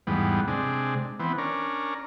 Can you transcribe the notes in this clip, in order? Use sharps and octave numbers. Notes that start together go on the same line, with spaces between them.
E2 G#2 G3 B3
C3 G#3 D4
E3 B3 C4
C#4 D4 A#4